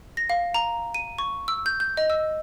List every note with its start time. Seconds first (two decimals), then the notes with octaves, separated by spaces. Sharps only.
0.17 A#6
0.30 F5
0.54 A#5
0.94 D#7
1.18 C#6
1.48 E6
1.66 G6
1.80 G6
1.97 D#5
2.10 E6